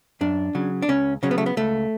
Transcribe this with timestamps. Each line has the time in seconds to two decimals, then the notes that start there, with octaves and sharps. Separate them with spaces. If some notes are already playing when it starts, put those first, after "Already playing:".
0.21 F#2 D4
0.55 C#3 F#3
0.82 D4
0.88 C#2 C#4
1.23 C#3 F#3 C#4
1.31 B3
1.38 A3
1.46 B3
1.57 C#2 A3